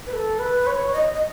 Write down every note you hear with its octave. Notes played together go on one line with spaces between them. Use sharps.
B4
A4
B4
C#5
D#5
D#5